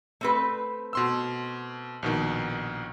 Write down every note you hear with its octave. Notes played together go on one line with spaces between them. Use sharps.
A3 C4 B4
B2 C6 E6
A#1 B2 D#3